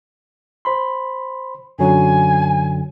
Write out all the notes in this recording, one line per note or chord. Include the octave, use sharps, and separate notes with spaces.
C5 B5 C6
F#2 D3 F#3 G#5